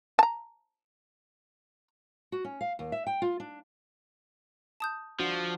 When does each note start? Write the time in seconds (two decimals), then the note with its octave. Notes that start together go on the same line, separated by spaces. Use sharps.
0.19 A5 A#5
2.32 F#4
2.44 C#4
2.61 F5
2.79 D#2
2.92 E5
3.07 G5
3.22 F4
3.40 D4
4.80 A5 D#6 G6
5.20 F3 D4 F#4